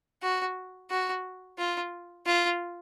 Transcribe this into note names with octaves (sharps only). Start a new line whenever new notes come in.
F#4
F#4
F4
F4